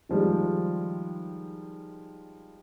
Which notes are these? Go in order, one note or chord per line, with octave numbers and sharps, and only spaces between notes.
D#3 F3 G3 G#3